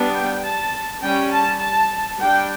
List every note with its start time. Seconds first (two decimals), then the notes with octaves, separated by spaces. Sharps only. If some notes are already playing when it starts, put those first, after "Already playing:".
Already playing: G3 B3 D4
0.15 G5
0.43 A5
1.02 G3 C#4 G5
1.31 A5
1.61 A5
2.18 G3 D4 G5